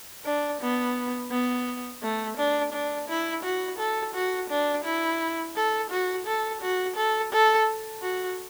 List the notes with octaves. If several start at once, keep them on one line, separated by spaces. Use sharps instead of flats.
D4
B3
B3
A3
D4
D4
E4
F#4
A4
F#4
D4
E4
A4
F#4
A4
F#4
A4
A4
F#4